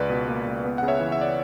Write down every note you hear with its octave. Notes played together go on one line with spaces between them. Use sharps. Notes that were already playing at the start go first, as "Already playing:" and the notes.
Already playing: C#2 B4 D5
B2
A#3
C#2
B3
C#3 F#5
C#5 E5
E3
E5
D5